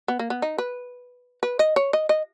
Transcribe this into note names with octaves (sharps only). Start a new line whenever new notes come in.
B3
A#3
B3
D#4
B4
B4
D#5
C#5
D#5
D#5